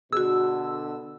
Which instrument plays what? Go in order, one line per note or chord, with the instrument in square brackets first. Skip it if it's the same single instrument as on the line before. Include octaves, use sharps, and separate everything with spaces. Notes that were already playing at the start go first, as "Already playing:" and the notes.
[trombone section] B2 D3 [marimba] F#4 G#4 [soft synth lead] E6